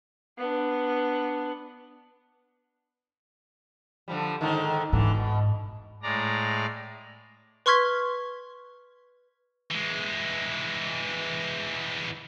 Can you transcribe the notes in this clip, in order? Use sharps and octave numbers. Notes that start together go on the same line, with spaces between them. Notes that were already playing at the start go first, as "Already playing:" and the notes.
B3 D4
D3 F3 G3
G#2 D3 D#3
G#2 D3 E3
B2
A2 G#3 D5 A#5
B4 C6 C#6 F6 G#6 B6
E3 G#3